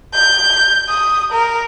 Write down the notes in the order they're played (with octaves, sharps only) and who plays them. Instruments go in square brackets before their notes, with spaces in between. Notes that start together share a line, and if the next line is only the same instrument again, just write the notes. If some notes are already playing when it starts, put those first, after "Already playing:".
[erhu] G6
D#6
A#4